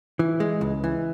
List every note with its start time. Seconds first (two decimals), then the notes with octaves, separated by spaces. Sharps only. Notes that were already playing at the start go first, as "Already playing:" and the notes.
0.19 E3
0.40 G#3
0.61 C#2
0.84 E3